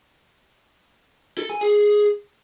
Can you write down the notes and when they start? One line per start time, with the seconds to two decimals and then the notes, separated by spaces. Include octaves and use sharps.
1.38 A4
1.50 G#5
1.61 G#4